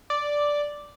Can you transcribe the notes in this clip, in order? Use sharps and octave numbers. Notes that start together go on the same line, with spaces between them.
D5